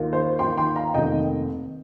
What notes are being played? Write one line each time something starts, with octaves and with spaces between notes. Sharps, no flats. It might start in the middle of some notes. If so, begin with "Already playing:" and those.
Already playing: D#2 D#3 A#3 F4
C5
D#2 D#3 A#3 F4 G5 C6
G5 C6
F5 A#5
F1 D#2 D#3 A#3 D#4 D#5 G5